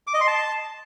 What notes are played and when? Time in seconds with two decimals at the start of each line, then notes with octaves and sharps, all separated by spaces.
0.07 D6
0.14 D#5
0.21 C6
0.27 A5